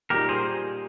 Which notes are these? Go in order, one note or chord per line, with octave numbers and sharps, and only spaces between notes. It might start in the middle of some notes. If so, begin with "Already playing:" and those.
A#2 G3 A#3 D#4 G4 A#4
G#4 C5